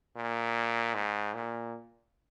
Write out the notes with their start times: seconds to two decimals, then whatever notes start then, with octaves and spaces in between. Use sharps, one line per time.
0.16 A#2
0.94 G#2
1.34 A#2